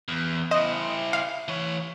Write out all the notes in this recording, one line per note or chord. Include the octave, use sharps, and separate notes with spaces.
E2
E4 C5 D#5
F5
E3 C#5